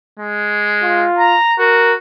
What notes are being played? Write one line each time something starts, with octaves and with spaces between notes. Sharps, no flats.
G#3
F4
A#5
F#4 A#4